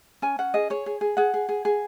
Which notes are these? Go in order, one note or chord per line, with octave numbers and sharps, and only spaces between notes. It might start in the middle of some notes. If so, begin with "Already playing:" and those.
C#4 G#5
C#4 F#5
G#4 D#5
G#4 C#5
G#4
G#4
G#4 F#5
G#4
G#4
G#4